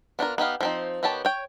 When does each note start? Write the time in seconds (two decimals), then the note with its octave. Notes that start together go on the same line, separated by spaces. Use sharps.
0.19 B3 D4 F4 A#4
0.38 B3 D#4 G4 F5
0.61 F3 C4 D#4
1.03 D#3 B3 G4 C#5 A5
1.25 C#5 G5